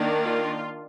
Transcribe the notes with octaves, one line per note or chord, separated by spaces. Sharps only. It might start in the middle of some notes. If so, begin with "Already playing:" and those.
Already playing: D#3 A#3 D4
F4